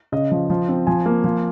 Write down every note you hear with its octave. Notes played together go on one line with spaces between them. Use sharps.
C#3 D#5
F3
F3
C4
F3 G#5
A#3
F3